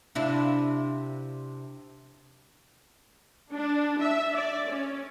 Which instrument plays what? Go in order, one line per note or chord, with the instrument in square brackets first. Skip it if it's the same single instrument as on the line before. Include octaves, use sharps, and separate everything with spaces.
[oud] C3 D4 E4
[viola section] D4
E5
D5
C#4